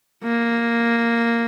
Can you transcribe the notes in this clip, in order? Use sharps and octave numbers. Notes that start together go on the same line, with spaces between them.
A#3